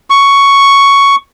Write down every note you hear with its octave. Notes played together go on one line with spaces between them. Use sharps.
C#6